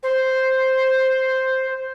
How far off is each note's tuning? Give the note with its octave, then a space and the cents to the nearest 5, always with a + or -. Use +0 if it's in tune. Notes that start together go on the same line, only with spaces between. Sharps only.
C5 +0